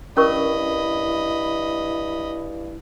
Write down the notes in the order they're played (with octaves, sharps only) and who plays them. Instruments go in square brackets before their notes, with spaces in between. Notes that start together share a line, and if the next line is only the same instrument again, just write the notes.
[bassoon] G2 [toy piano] C#4 A#4 C#6 [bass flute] E4 [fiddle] D#5 B5